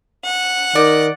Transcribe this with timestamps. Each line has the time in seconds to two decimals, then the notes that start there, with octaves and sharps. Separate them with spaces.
0.23 F#5
0.75 D#3 D5